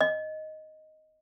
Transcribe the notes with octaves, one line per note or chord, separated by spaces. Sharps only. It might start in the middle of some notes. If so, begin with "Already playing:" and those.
D#5